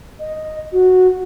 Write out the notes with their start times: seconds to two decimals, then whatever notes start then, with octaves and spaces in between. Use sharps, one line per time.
0.20 D#5
0.72 F#4